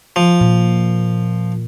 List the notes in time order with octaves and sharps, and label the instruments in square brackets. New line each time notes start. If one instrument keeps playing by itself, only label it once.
[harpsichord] F3
[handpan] A#2